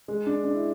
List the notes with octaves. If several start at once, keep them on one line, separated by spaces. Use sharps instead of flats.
G#3
D4
D4
E4